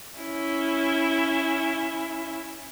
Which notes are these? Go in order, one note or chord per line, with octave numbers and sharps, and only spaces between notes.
C#4 E4